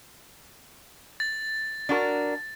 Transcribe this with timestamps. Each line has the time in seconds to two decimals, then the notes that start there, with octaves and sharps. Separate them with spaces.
1.20 A6
1.89 D4 F#4 A#4